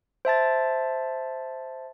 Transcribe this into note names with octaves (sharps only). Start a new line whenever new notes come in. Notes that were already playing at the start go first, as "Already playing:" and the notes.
C5 E5 A5 A6